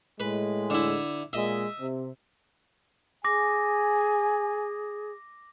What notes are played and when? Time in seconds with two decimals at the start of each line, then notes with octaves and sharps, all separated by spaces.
0.20 A2 G#3 B4
0.70 D3 E4
1.33 A#2 G#3 D#5 E5
1.79 C3
3.25 G#4 G#5 D6 A#6